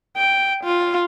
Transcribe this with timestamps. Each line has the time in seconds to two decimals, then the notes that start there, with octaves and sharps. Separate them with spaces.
0.17 G5
0.64 F4